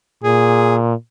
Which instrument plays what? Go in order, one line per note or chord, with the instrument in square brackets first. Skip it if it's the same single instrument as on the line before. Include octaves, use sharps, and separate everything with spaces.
[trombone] A#2 [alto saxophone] G#4